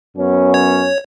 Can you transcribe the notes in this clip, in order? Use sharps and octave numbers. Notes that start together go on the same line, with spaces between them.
F#2 B3 C#4
C#5